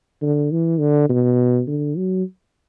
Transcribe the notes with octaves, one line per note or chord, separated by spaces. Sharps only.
D3
E3
D3
B2
D3
F#3